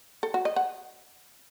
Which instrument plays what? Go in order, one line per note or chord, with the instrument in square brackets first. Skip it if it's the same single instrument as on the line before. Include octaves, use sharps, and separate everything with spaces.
[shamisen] A4
F#4
D#5
F#5